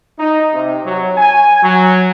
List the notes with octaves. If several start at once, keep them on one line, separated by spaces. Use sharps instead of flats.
D#4
C3
F#3
G#5
F#3